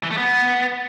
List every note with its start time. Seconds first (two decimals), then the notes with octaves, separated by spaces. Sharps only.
0.04 E3
0.11 A3
0.17 B3